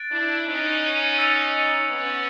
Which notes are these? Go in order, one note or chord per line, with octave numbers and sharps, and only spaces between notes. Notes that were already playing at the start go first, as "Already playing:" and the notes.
Already playing: F#6 A6 D7
D4 E4
C#4 D#4
E6 A6 C#7 F7
B3 C#4